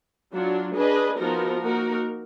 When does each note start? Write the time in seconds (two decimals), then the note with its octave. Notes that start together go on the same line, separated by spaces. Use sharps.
0.33 F#3 D4 F4
0.76 D4 G#4 B4 D#5
1.18 F3 B3 D#4 F#4 A#4
1.61 A#3 D#4 F#4 A#4